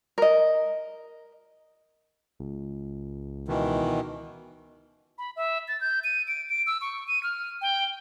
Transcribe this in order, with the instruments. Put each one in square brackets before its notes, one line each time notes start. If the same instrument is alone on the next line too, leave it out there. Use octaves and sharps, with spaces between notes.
[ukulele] A#4 D#5
[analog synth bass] C#2
[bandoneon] B2 D#3 E3
[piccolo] B5
E5
A6
G6
D#7
D7
D7
E6
C#6
D#7
F6
G5